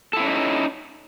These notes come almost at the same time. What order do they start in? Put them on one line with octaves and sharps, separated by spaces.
A4 E4 C4 C#4 D#4